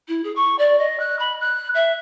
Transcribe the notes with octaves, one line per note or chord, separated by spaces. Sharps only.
E4
G#4
C#6
D5
D#5
F#6
B5
F#6
E5